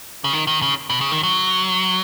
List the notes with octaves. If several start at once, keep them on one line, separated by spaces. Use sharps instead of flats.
C#3
D#3
D#3
C#3
B2
C#3
D#3
F#3